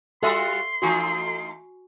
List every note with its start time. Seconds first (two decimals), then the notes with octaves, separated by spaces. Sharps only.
0.23 G3 F4 F#4 A4 E5 C6
0.82 E3 A3 D#4 F#4 G#5 C#6